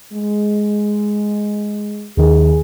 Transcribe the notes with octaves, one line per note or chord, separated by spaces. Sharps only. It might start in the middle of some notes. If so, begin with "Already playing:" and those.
G#3
D#2 D#3 G#4